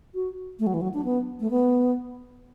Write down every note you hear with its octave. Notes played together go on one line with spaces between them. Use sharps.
F#4
A3
F#3
E3
F#3
D4
B3
A3
B3